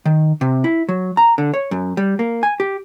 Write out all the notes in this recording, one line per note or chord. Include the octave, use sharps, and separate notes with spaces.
D#3
C3
E4
F#3
A#5
D3
C#5
F#2
G3
A#3
G#5
G4